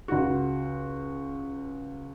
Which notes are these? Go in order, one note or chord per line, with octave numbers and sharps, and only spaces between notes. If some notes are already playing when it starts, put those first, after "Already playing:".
C#2 F#4